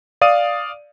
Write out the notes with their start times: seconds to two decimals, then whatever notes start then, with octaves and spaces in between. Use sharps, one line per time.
0.21 D5 F5 D#6 D#7